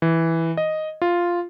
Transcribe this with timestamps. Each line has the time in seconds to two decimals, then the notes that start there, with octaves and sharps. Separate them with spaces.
0.02 E3
0.57 D#5
1.02 F4